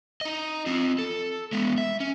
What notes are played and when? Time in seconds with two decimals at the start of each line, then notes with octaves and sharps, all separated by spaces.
0.21 D#4 D#5
0.66 C4 F4
0.98 A4
1.52 G#3 B3
1.78 E5
2.00 C#4